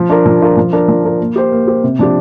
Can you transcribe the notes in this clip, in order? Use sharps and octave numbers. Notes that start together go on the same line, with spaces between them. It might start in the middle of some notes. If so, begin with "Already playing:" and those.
Already playing: F3
D4 F4 A#4
F3
D4 F4 A#4
F3
D4 A#4
F3
D4 A#4
A#3
G4 C5
A#3
G4 C5
C3
F3 D4 G4